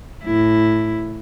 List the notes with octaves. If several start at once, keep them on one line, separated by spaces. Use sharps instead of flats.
A2 E4